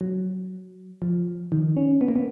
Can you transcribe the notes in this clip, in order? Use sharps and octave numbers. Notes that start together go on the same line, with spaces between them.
F#3
F3
D#3
C#4
B3
A#3
B3